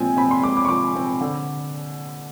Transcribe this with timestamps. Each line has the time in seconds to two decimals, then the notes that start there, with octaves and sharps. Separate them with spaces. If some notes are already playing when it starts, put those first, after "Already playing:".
Already playing: A#2 F3 G#3 C4 G#5
0.17 C4 B5
0.31 C6
0.43 G#3 D6
0.57 D6
0.65 C#6
0.68 F3 D6
0.95 C4
1.21 D3